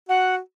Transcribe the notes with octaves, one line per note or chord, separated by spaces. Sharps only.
F#4 F#5